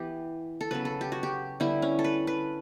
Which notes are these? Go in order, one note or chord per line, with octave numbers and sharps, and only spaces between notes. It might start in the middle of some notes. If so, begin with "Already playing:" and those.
Already playing: E3 B3 G4
A4
C#3 F#3 B3 B4
A4
G4
F#4
G4
D3 G3 B3 E4
C#4
A4
B4
B4